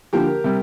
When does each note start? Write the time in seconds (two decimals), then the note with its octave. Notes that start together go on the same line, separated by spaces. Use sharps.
0.13 D3 F3 A#3 G4 A#4
0.44 C3 G3